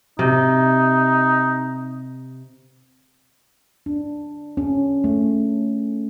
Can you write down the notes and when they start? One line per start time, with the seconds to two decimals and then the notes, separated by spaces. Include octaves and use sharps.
0.19 C3 D#4
3.86 D4
4.57 C#4
5.04 A3